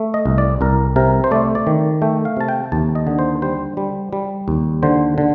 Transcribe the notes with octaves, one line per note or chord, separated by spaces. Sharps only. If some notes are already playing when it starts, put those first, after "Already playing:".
Already playing: A3
D#5
C2
D5
C2 A#4
C3 A#4
C5
A3 D5
D5
D#3
A3 G5
F5
C3 A5
G5
D#2 A5
D#5
D3
C5
G3 C5
G3
G3
D#2
D3 C5
D3